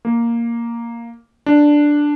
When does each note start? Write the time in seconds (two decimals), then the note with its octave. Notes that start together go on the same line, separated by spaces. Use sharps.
0.05 A#3
1.46 D4